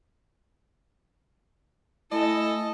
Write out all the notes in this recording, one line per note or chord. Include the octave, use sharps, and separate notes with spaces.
A3 E4 A4 D#5 G#5 A5